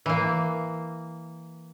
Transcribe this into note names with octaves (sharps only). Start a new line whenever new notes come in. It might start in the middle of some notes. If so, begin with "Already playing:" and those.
E3 A#3